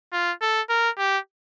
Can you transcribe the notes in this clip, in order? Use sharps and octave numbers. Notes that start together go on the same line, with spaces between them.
F4
A4
A#4
G4